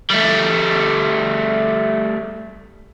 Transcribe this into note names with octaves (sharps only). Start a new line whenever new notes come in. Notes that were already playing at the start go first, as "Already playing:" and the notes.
G3 A3